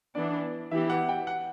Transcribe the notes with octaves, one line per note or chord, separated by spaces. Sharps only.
E3 B3 D4 D5
E3 B3 E4 G4 E5
F#5
G5
F#5